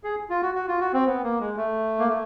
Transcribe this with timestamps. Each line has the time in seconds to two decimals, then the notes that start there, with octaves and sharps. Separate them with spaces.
0.04 G#4
0.30 F4
0.42 F#4
0.55 F#4
0.68 F4
0.81 F#4
0.93 C4
1.06 B3
1.23 A#3
1.40 G#3
1.57 A3
1.99 A#3
2.09 A3